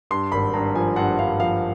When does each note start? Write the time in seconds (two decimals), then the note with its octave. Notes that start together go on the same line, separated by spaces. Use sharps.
0.11 G2 C6
0.32 G#1 B5
0.54 G2 A#5
0.75 F3 G#5
0.96 G2 F#5
1.19 G2 F5
1.39 F3 F5